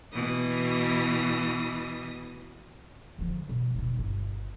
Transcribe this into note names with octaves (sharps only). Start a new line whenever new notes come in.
B2 E3 D#6
D3 F3
B2
D#2 B2
G1